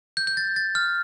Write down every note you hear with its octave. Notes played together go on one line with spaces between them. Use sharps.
G6
G6
A6
A6
F6